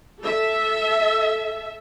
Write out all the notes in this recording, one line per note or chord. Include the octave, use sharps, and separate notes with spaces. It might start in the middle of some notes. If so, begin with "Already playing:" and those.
A4 E5